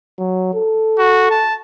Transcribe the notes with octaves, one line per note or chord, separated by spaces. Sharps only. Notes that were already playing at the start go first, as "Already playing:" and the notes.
F#3
A4
F#4
A5